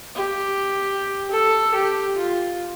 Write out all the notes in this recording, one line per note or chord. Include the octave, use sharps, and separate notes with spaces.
G4
A4
G4
F4